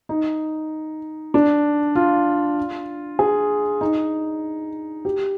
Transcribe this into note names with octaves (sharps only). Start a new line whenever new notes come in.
D#4
D4
F4
G#4
D#4
G4